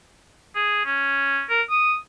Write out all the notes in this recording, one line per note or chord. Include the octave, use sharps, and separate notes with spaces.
G#4
C#4
A#4
D#6